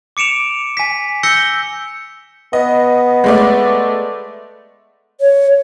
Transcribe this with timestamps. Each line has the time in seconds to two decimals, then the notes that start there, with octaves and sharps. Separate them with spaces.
0.17 D6 C#7 D7 E7 F7
0.77 G#5 B6
1.23 E6 G6 A#6 C#7 G7
2.53 B3 D#5
3.24 G#3 A3 D5
5.21 C#5